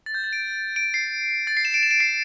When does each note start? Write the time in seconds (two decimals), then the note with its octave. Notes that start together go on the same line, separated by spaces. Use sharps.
0.06 A6
0.14 G6
0.24 A6
0.33 D7
0.76 D7
0.94 C7
1.47 A6
1.57 C7
1.65 E7
1.74 D7
1.83 E7
1.91 D7
2.00 C7